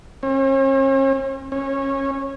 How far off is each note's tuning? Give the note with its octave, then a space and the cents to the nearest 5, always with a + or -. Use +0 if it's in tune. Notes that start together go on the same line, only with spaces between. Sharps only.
C#4 -45
C#4 -20